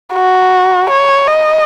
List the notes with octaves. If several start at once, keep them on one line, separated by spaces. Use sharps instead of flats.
F#4
C#5
D#5